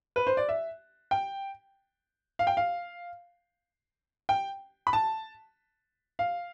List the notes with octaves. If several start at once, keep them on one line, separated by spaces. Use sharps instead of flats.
B4
C5
D5
E5
G5
F5
G5
F5
G5
B5
A5
F5